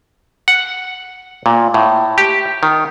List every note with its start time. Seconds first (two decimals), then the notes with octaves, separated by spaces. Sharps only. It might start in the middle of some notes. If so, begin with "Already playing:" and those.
0.48 F#5
1.46 A#2
1.74 A2
2.18 G4
2.63 D#3